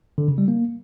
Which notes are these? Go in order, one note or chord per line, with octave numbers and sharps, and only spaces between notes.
D3
C#3
G3
A#3